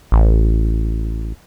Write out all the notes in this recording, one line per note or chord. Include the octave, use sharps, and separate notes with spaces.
A1